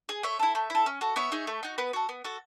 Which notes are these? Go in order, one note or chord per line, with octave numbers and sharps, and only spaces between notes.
G#4
A3 C#5 E5
E4 A4
A3
E4 A4
C#4
F#4 A4
B3 C#5 E5
D#4 G#4
A3
D#4 F#4
B3 B4
F#4 A4
B3
F#4 A4